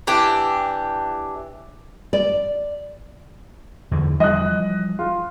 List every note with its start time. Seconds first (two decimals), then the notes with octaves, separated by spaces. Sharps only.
0.07 E3 D4 G4
2.13 D5
3.91 E2 D3
4.20 E3 F3 G3 D#5 F#6
4.99 F4